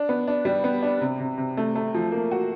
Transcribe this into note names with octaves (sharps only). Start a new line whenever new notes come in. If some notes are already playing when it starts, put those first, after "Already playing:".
Already playing: D4
B3
D4
G3
B3
D4
C3
C3
C3
A3
A3
F3
A#3
F#4